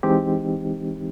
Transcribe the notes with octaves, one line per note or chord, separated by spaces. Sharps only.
E3 G#3 C4 D#4 G4